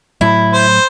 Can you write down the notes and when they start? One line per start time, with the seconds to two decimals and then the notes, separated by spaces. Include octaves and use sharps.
0.21 A2 F#3 E4
0.53 C5